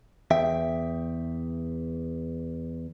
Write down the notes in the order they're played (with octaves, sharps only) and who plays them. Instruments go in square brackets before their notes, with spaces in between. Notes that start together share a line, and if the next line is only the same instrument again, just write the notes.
[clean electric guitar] E2 E5 G5